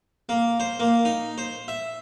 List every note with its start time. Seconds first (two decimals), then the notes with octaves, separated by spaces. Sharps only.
0.29 A#3
0.60 C5
0.80 A#3
1.05 D#4
1.38 C5
1.68 E5